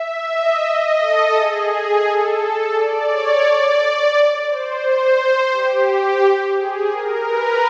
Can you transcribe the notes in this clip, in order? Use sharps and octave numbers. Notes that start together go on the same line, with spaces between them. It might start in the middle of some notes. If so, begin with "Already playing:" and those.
Already playing: E5
D#5
A4
G#4
A4
A4
D5
C#5
D5
C5
G4
G#4
A#4
B4